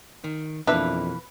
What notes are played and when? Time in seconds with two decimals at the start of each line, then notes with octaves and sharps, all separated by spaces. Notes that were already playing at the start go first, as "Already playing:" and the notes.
0.24 D#3
0.67 F2 B2 E3 A#3 D4 B4 E5